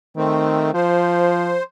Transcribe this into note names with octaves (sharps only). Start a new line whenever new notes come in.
D#3 A3 C4
F3 C5